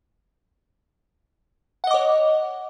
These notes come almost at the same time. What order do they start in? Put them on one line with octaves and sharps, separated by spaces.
F#5 D#5 D6 C#5